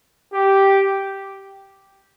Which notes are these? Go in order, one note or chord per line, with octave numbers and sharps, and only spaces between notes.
G4